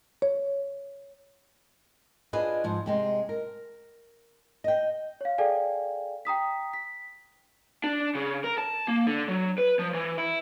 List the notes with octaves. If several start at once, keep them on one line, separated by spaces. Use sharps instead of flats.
C#5
D4 F4 G#4 B4 D#5
G#2 F3
C3 G#3 C4
A#4
D#5 G5
C#5 F5
G#4 A4 D5 F5 G5 G#5
G5 A#5 D#6 B6
B6
D4
C#3
A#4
A5
A#3
D3
F#3
B4
F3
E3
E4